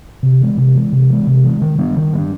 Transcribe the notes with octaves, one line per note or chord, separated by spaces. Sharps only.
C3
E3 G#3
C3
E3 G#3
C3
E3 G#3
C3
E3 G#3
D#3
G3 B3 D4
D#3
G3 B3 D4